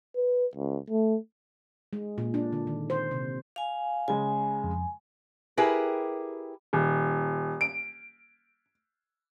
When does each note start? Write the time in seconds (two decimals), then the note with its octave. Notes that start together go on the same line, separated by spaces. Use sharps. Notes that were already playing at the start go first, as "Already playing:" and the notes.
0.16 B4
0.56 C#2
0.90 A3
1.93 G#3
2.18 A#2
2.34 D4
2.52 D3
2.67 D#3
2.90 C5
3.11 C3
3.56 F5 G#5
4.08 C#3 G#3 G#5
4.64 F2
5.57 E4 G4 G#4 A#4 B4
6.73 D#1
7.61 D7